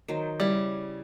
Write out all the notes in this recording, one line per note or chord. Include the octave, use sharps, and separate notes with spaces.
D#3 F#3 C5
C#3 G3 E4